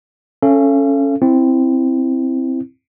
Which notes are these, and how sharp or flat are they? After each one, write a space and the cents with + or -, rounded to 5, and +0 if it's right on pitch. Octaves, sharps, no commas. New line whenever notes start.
C#4 +0 A4 +0 F5 -40
C4 +0 E4 +0